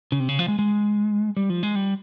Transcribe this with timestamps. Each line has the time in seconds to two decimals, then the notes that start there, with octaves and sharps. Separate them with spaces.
0.12 C#3
0.20 C3
0.29 C#3
0.39 F3
0.48 G#3
0.59 G#3
1.37 G3
1.50 F3
1.63 G#3
1.75 G3